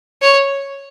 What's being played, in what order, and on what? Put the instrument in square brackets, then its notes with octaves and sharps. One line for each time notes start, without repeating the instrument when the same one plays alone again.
[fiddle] C#5